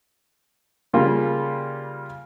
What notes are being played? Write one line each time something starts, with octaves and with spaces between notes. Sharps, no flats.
C#3 G3 A#3 F4